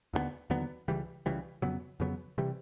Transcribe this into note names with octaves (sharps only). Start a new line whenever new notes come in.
D#2 D3 F#3 B3
D#2 D3 F#3 B3
C#2 C#3 E3 G3
C#2 C#3 E3 G3
F2 C#3 F#3 B3
F2 C#3 F#3 B3
C3 E3 G3